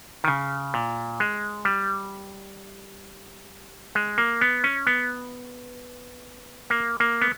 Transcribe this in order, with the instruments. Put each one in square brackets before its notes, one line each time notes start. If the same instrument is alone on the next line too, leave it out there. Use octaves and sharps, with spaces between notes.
[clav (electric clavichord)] D#3
C#3
A#2
G#3
G3
G#3
A#3
B3
C#4
B3
A#3
A#3
B3